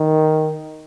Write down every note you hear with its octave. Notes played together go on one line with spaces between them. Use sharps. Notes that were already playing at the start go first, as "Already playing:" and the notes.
Already playing: D#3